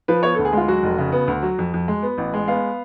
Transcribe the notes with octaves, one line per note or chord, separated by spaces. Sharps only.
F3 B4
B3 C#5
D2 A4
G#4
G#3 F4
F#3 F#4
F1
C#3
B3
D2
F#3
F2
F2
G#3
B3
A1
G#3
B3 F5